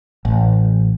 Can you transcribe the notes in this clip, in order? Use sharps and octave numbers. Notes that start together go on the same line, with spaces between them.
A1